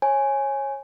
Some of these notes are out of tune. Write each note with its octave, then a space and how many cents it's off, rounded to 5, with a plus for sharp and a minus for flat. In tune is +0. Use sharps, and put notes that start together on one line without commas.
C#5 -20 G#5 +0